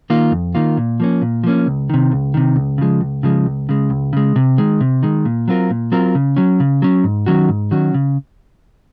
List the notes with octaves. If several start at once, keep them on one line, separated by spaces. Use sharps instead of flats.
D#3 A#3 F4
F2
D#3 A#3 F4
A#2
F3 A#3 C#4
A#2
F3 A#3 C#4
C#2
C3 D#3
C#2
C3 D#3
C#2
C#3 F3 G#3
C#2
C#3 F3 G#3
C#2
C#3 G#3
C#2
C#3 G#3
C3
D#3 G#3
C3
D#3 G#3
A#2
F#3 C4 F4 A#4
A#2
F#3 C4 F4 A#4
C#3
F#3 C#4
C#3
F#3 C#4
G#2
D#3 F#3 C#4 F#4
G#2
D#3 F#3 C#4 F#4
C#3